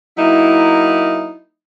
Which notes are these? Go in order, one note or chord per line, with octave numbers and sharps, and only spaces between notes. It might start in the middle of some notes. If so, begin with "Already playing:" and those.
F#3 A#3 D#4 E4